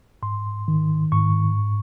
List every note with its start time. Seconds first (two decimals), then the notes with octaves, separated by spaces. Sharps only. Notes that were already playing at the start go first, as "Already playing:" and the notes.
0.23 G#2 C6
0.68 D#3
1.12 G#2 C#6